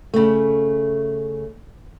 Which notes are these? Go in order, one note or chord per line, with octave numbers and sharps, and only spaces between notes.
C#3 A3